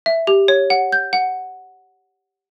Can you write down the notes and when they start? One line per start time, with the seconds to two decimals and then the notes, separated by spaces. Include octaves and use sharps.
0.06 E5
0.27 G4
0.48 C#5
0.70 F#5
0.92 G6
1.13 F#5